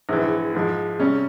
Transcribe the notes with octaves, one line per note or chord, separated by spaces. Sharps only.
A#1 G#2 E3
G#2 F3 G#3
C3 G3 C#4